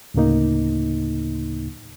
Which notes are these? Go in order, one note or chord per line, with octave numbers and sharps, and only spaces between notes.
D2 A2 C#3 A#3 D#4